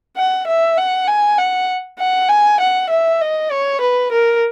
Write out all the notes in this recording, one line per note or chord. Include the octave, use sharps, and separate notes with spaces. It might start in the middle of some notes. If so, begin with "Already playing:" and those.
F#5
E5
F#5
G#5
F#5
F#5
G#5
F#5
E5
D#5
C#5
B4
A#4